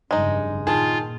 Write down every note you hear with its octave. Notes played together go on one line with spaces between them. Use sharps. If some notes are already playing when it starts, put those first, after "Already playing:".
F1 G2 C#3 G#3 D#4
A#2 D#3 F4 G#4 A5